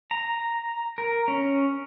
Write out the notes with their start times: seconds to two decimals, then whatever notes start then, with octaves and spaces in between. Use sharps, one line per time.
0.11 A#5
0.98 A#4
1.28 C#4